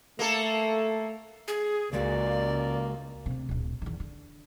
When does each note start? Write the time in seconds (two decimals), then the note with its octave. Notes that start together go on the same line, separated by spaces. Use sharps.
0.19 A3 A#3 A4
1.48 G#4
1.93 C#2 C#3 G#3 A#3 F#4 D5
3.26 D2 C3
3.49 D1 A#1
3.82 E2 D#3
4.00 D3